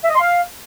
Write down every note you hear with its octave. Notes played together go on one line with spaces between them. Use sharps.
E5
D#5
C6
F5